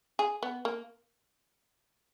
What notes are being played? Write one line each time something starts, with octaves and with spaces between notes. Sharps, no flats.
G#4
B3
A#3